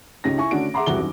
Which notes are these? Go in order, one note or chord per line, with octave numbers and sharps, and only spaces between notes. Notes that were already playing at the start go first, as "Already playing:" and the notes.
C#2 C#4 D#4 G4 A#6
E4 G#5 C#6
D3 A3 C#4 D4 F#4 D7
G#4 E5 F#5 A#5 C6 D6
E1 C2 G3 E4 F#4 G7
F#2 D#3